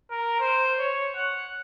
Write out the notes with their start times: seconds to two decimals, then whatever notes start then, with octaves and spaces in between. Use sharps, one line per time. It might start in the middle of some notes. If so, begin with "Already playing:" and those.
0.11 A#4
0.40 C5
0.79 C#5
1.16 F#5